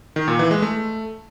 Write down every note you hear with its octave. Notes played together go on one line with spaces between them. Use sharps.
D#3
A#2
E3
G#3
A3